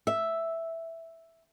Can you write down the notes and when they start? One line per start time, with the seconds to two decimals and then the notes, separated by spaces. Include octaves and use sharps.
0.07 E5